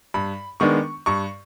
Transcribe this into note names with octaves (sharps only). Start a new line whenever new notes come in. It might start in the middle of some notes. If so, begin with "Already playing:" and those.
G2 B5
D#3 G#3 B3 D4 C#6
G2 C#6